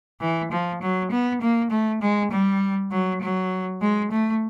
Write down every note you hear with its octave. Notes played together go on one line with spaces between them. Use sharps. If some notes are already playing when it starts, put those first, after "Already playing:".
E3
F3
F#3
B3
A#3
A3
G#3
G3
F#3
F#3
G#3
A3